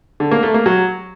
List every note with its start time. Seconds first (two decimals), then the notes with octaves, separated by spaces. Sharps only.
0.20 D3
0.31 A#3
0.43 A3
0.54 A#3
0.66 F#3